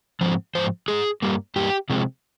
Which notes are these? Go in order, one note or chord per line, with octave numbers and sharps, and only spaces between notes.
G#2 F3 C4
G#2 F3 C5
G#2 F3 G#3 G#4
G2 G3 A#3
G2 G3 A#3 G4
C3 F3 G#3 C4